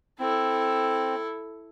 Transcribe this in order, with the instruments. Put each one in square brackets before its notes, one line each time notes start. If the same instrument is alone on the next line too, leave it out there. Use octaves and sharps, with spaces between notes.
[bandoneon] C4 [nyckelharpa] E4 A4